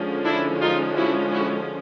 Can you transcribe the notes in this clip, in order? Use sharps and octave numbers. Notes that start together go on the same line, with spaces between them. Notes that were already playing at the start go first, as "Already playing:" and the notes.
Already playing: D3 F3 G#3 C#4
D4 E4
D#4 F4
E4 F#4
E4 F#4